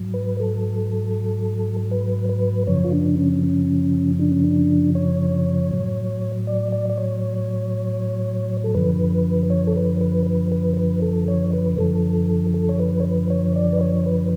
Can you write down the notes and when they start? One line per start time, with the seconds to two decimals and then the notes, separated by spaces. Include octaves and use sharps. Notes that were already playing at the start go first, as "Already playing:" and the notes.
Already playing: G#2 F#3
0.14 B4
0.40 A4
1.91 B4
2.29 B4
2.67 F#2 C#3 F3 C#5
2.84 F4
2.93 D4
3.18 C#4
3.43 C#4
4.19 D4
4.31 C#4
4.44 D4
4.95 C#5
5.72 A2 F#3
6.47 D5
6.72 D5
6.90 D5
6.97 C#5
8.64 A4
8.75 F#2 D3 F3 B4
9.50 C#5
9.67 A4
9.76 B4
10.01 B4
10.27 B4
10.52 B4
10.77 B4
11.02 A4
11.28 C#5
11.53 B4
11.78 F#2 D3 F3 A4
12.54 A4
12.69 C#5
12.80 B4
13.00 C#5
13.05 B4
13.30 C#5
13.56 D5
13.73 B4
13.81 C#5
14.06 B4